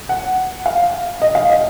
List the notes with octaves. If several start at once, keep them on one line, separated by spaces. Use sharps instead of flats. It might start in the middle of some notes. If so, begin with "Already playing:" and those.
F#5
F5
D#5
F5
D#5